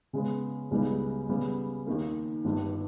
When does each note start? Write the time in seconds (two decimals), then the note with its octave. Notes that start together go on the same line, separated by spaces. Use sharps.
0.13 C#3 G#3 B3
0.71 C#2 C#3 G3 B3 D#4
1.29 C#3 G3 B3
1.87 D#2 D#3 A#3
2.45 G1 G2 D#3